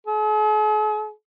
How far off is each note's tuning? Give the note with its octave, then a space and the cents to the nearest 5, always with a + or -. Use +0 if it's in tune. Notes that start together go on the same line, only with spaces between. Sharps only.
G#4 +45